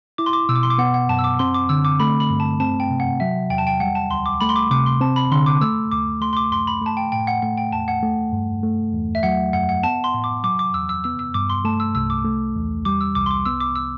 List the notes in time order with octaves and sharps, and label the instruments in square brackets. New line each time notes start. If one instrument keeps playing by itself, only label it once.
[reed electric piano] E4 [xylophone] D6
[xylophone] C6
D6
[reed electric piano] B2 [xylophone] E6
[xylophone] D6
C6
D6
[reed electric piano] B3 [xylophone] F#5
[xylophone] F#5
[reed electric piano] F#2 [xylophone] A5
[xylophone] E6
D6
[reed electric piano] C4 [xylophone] C6
[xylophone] D6
[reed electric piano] D3 [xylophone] E6
[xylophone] D6
[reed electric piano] A3 [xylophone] B5
[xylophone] B5
[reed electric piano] G2
[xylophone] A5
[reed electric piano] C4 [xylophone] A5
[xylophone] G5
[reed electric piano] C3
[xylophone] F#5
[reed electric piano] F#3 [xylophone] E5
[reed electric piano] E2 [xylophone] G5
[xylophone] A5
G5
[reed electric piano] G3 [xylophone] F#5
[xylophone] A5
[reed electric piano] D2 [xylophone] C6
[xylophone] D6
[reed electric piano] A3 [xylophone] B5
[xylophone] C6
D6
[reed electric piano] C3 [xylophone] D6
[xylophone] C6
[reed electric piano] C4 [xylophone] A5
[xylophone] B5
[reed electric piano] D3 [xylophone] C6
[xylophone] D6
[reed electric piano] A3 [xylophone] E6
[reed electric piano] D2 [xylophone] D6
[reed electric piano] A3 [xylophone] C6
[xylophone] C6
D6
[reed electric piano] F#2 [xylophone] C6
[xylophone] B5
[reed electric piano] A3 [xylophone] A5
[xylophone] G5
[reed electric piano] A2 [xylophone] G5
[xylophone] F#5
[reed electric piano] A3 [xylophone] F#5
[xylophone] G5
[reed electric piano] E2 [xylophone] A5
[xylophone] F#5
[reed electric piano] A3
G2
A3
E2
[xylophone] E5
[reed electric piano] F#3 [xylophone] F#5
[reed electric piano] F#2 [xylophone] F#5
[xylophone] F#5
[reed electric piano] B3 [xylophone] A5
[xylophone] C6
[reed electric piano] A2
[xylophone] D6
[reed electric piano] F#3 [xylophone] D6
[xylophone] D6
[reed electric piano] E2 [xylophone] E6
[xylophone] E6
[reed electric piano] B3 [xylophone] E6
[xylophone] E6
[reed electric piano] G2 [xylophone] D6
[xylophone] C6
[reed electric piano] A3 [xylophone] A5
[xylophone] E6
[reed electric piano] C2 [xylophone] E6
[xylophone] D6
[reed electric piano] A3
E2
[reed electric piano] G3 [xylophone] D6
[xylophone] E6
[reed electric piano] C2 [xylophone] D6
[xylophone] C6
D6
[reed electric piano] B3 [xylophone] E6
[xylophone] D6
E6